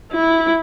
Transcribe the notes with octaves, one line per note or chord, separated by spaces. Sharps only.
E4